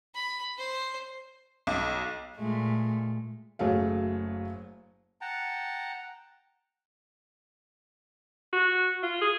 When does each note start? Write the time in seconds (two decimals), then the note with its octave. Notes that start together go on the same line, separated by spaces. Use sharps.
0.15 B5
0.58 C5
1.67 B1
2.37 A#2 G#3 A3
3.59 F#1 F#3 A3 G#4 F5
5.21 F#5 G5 A5 A#5
8.53 F#4
9.03 F4
9.22 G#4